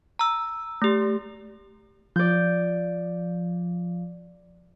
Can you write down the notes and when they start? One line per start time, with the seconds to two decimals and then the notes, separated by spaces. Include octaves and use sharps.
0.19 A#5 E6
0.82 A3 G4
2.16 F3 D5 G6